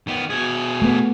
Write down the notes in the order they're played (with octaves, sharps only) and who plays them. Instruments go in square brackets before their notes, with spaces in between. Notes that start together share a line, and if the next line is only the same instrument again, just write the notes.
[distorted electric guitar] D#3 B3
B2 G#4
[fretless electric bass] A3 B3